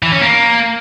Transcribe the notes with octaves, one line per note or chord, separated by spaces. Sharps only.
E3
C#4
A#3